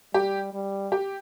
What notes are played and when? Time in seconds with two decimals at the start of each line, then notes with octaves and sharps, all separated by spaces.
0.14 G3 G4
0.53 G3
0.92 G4